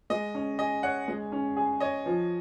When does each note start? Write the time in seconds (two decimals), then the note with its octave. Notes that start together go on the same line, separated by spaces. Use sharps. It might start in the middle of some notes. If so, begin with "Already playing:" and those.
0.10 G#3 D#5
0.35 C#4
0.59 G#4 D#5
0.83 C#5 F#5
1.08 G#3
1.32 C#4
1.57 G#4
1.80 C#5 D#5
2.06 F3